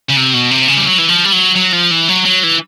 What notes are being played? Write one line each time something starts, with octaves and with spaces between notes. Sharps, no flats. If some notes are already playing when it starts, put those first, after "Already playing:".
C#3
C3
B2
C3
C#3
G3
F#3
E3
F3
G3
F#3
F#3
F3
E3
F#3
F#3
E3